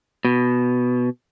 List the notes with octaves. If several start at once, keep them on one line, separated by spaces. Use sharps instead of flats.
B2